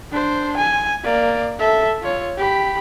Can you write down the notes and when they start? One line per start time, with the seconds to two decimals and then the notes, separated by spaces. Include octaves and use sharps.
0.12 D4 C5
0.58 G#5
1.04 A#3 D5
1.59 A4 E5
2.02 F4 C#5
2.38 G4 B5